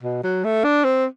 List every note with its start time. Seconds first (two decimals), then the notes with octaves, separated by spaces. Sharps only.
0.03 B2
0.24 F#3
0.44 A3
0.64 D4
0.84 C4